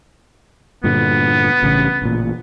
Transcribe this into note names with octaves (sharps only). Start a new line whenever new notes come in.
G2 A#2 D3 B3
A1 G2 C#3
A1 A#2